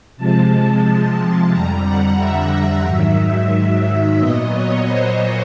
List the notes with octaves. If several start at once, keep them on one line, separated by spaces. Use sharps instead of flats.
C3 F3 G#3 A5
F2 D3 G3 A#5
F#5
E5
G#2 D#3 F#3
A#2 F#3 B3 D#5
C#5
C5